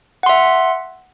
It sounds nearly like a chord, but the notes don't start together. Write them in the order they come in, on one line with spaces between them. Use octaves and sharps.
F#5 C6 E5